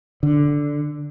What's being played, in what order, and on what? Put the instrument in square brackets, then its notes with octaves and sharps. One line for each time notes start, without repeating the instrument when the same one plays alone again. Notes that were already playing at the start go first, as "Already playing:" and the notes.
[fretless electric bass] D3